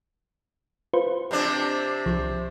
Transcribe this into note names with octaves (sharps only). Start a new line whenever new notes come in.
F4 B4 C5
C3 C4 D4
C2 F3